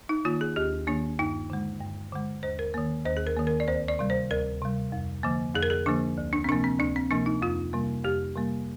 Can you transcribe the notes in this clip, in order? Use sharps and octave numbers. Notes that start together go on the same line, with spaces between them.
D#4
D#3 A#3 F4
G#4
D#2 G4
D#3 A#3 D4
G2 D#4
D3 G#3
G2
D3 G#3
D#2 C5
A#4
D#3 A#3
D#2 C5
G#4
A#4
D#3 A#3
A#4
D5
D2 C5
D5
C3 G3
C5
D2 A#4
C3 G3
F2
D3 F3 A#3
F2 G#4
A#4
G#4
D3 F3 A#3 D4
D2
D4
C4
C3 F3 A#3 D4
C4
D2 D4
C4
C3 F3 A#3 D4
D#4
F2 F4
C3 G3 A#3
F2 G4
C3 G3 A#3